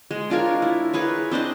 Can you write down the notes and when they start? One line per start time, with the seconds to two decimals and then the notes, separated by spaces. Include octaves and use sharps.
0.11 G#3
0.30 D4 F4 A#4 C#5
0.62 E4
0.93 G#4 A#4 B4 C#5
1.31 C4 D4 C5 D#5